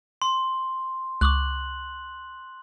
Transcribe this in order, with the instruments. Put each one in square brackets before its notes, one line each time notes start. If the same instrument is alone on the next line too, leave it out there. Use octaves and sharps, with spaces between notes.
[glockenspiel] C6
[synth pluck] C#2 C#6 D6 [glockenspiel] F#6 F#7